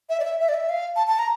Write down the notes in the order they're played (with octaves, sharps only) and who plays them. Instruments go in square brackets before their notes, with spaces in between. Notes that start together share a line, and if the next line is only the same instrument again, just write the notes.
[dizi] E5
D5
E5
E5
D5
E5
F5
A5
A5
A#5